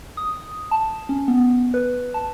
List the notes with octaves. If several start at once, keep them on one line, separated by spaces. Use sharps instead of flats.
D#6
A5
C#4
B3
B4
A5